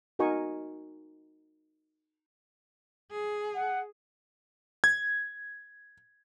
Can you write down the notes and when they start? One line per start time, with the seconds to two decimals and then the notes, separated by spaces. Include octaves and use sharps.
0.19 D#4 F#4 A#4 D#5 G#5 C#6
3.11 G#4
3.55 F#5
4.84 G#6